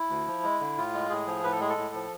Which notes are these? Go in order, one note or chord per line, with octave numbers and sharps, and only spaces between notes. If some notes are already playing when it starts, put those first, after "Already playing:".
Already playing: E4
D2
F3
G#3
D3
A2 F4
G#3
A2 G#4
F3
A2 B4
A4
G#3 G#4
A4
A2
F3